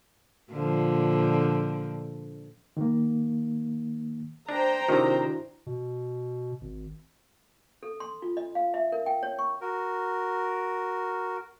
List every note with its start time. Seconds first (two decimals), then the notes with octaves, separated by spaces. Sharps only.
0.51 A#2 D3 F3
2.77 D#3 A#3
4.49 D4 C5 G5 A#5
4.88 C3 D#3 D4 E4 F#4
5.66 B2
6.61 G#1
7.83 A4
8.00 C6
8.22 F4
8.37 D#5
8.55 F5
8.74 E5
8.92 A#4
9.06 G5
9.23 C#5
9.39 C#6
9.61 F#4 A#4